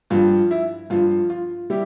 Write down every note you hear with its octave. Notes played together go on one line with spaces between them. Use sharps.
G2 F3 F4
E4
G2 F3 F4
F4
G3 E4 G4